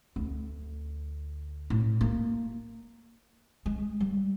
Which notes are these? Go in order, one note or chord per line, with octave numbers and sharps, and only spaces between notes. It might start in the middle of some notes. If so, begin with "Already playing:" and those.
D2
A2
A#3
G#3
G3